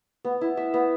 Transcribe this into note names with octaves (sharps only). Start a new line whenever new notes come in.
B3
E4
E5
B3